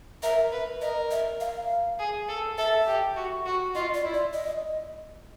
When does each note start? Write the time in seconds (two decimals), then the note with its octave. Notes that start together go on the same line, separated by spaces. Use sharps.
0.23 A#4 E5
0.52 B4
0.82 A#4 D#5
1.11 E5
1.41 F5
1.99 G#4
2.29 A4
2.58 A4 E5
2.87 G4
3.16 F#4
3.46 F#4
3.75 F4 D#5
3.94 D5
4.05 E4
4.14 D5
4.33 D#5